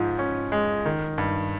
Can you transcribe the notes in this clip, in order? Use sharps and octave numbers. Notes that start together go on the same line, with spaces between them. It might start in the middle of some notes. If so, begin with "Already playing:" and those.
Already playing: G#2 F3
C#4
G#3
D#3
G2